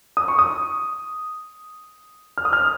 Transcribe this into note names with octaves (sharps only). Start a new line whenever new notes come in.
D#6
C#6
D#6
F6
D#6
F6